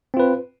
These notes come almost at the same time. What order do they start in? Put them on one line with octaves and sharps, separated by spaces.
C4 F4 B4